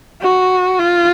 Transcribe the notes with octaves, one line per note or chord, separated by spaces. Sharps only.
F#4
F4